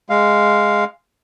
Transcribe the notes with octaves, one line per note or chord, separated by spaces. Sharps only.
G#3 F5